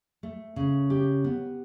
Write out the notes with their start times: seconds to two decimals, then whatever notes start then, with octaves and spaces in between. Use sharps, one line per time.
0.23 A3
0.56 C#3
0.90 G4
1.24 B3